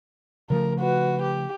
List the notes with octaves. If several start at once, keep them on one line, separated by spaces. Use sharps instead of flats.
C#3 F3 A3 A#4
F#4 B4
G4